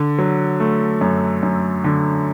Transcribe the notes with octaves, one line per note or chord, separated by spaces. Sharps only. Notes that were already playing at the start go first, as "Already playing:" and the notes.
Already playing: D3
F#3
A3
F#2
F#2
D3